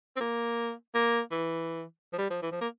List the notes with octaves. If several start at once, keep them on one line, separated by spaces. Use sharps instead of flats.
C4
A#3
A#3
E3
F3
G3
F3
E3
F3
A#3